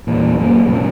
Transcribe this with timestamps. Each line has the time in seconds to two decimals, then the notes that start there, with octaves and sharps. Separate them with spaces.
0.07 E2 A#2
0.39 B1 F#2 D#3 A#3
0.65 C2 F#2 A#2